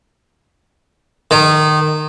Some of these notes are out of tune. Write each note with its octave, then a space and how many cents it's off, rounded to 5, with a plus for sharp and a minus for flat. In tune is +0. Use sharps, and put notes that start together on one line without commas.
D#3 -20